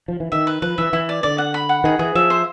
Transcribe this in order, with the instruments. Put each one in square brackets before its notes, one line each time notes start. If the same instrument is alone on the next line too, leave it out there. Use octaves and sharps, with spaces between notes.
[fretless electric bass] F3
E3
[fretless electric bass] D#3 [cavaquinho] E5
[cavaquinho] B4
[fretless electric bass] F3 [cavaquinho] B4
[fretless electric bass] E3 [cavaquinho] E5
[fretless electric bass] E3 [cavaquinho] E4
[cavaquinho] D5
[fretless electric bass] D3 [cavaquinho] D5
[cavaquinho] F#5
B5
F#5
[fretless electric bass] D#3 [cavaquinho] G#4
[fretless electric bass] E3 [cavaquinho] G#4
[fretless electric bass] F3 [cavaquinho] E5
[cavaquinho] C5